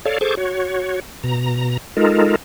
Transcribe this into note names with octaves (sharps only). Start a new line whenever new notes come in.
A4 C#5 D5 F5
G#4 A4 C5 C#6 D6
F#4 C#5
B2 A#5
G#3 D#4 F4 A4 A#4